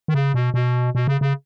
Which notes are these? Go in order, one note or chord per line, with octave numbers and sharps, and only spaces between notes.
D#3
C#3
B2
B2
B2
C#3
C#3